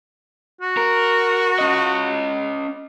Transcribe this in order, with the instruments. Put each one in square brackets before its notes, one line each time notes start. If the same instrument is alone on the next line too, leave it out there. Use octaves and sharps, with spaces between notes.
[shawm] F#4
[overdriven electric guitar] A#4
C#4 D#5